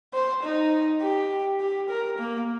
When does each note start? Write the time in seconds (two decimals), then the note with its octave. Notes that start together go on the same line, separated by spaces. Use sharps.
0.14 C5
0.43 D#4
1.01 G4
1.60 G4
1.89 A#4
2.19 A#3